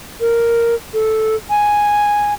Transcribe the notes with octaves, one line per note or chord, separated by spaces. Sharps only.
A#4
A4
G#5